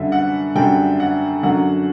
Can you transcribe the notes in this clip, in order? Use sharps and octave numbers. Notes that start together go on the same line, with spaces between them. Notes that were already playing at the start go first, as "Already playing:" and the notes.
Already playing: F#2 D3 G3 E5
F#5
F#2 D3 G3 G5
F#5
F#2 D3 F#3 F#5